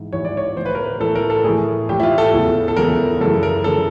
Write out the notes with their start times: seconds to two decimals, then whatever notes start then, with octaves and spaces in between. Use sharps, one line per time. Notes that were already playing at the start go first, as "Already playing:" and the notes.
Already playing: G#2 E3
0.13 G#2 E3 C#5
0.25 D5
0.37 C#5
0.56 A2 E3 C5
0.66 B4
0.75 A#4
0.84 B4
1.00 A2 E3 A4
1.15 A#4
1.30 A4
1.44 A2 E3 G#4
1.89 A2 E3 G4
2.00 E4
2.03 F4
2.18 A4
2.33 E2 C#3 E3
2.68 A4
2.76 E2 C#3 E3 A#4
3.21 F#2 C#3 E3 A4
3.43 A#4
3.64 C#3 E3 A4